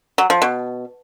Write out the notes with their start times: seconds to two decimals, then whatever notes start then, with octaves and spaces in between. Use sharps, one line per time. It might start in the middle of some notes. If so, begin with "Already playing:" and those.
0.18 F#3
0.30 F3
0.42 B2